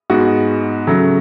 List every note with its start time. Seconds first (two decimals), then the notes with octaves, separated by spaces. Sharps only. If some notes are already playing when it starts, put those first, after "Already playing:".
0.10 G#2 G#3 B3 F#4
0.87 C#3 F#3 A3